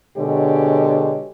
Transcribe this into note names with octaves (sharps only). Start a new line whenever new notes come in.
B2 D3 G#3 G4 C#5